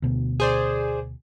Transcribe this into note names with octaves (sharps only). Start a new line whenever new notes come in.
D2 B2
G#4 C5 D5